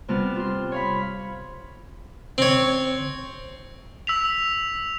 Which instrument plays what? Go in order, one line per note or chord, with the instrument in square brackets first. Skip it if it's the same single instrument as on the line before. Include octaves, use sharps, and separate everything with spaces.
[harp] C3 G3 B3 F4 A5 F6
F4 C6
C#5 F5 B5
[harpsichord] C4 C#5
[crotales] E6 B6 F7